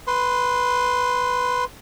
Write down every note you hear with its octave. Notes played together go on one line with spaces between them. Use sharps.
B4 C6